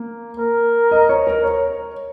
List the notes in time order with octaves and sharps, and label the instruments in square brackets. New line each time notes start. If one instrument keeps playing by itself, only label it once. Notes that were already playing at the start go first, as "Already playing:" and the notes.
Already playing: [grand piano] A#3
[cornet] A#4
[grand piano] D#5
C#5
A#4
C#5